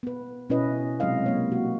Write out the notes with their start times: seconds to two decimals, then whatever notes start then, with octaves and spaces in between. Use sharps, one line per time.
0.03 B3 B4
0.50 B2 C#4 E4 B4 D#5
1.00 C3 F#3 G#3 D#5 F5
1.26 A#3 C#5
1.52 F#4